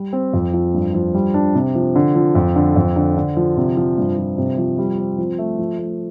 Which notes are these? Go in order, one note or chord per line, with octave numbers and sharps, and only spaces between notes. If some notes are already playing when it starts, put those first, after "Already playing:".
Already playing: G3
C4
F2
F3
G2
F3
G3
D4
C3
F3
D3
F3
F2
D3
F2
D3
D3
F3
C3
F3
G2
F3
C3
F3
G3
C4
F3
A3
F3
A3